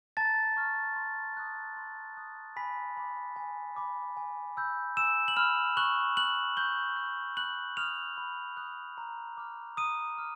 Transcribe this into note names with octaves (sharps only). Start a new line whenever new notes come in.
A5 A#5 A6
C#6 F6
C6
D#6 F#6
C6
D#6 F#6
G#5 B5 B6
B5 D6
G#5
B5 D6
G#5
B5 E6 G6
G#5 E6 E7
F#7
B5 E6 F6 G6 F7
C#6 F#6 F#7
F#6 F#7
C#6 G6 G7
F#6
B5 F#6 F#7
D#6 F6 F#6 F7
B5
D#6 F#6
A#5
D6 F6
A#5 D#6 D#7
D6 F6